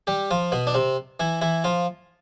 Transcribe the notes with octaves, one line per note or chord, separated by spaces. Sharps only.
G3 G4
F3 F4
B2 B3
D4
C3 C4
E3 E4
E3 E4
F3 F4